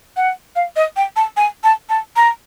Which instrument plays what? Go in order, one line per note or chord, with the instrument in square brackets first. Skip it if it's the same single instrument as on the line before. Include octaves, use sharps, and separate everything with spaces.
[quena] F#5
F5
D#5
G5
A5
G#5
A5
A5
A#5